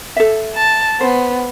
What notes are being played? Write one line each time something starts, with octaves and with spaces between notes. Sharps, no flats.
A4 E5
A5
B3 C5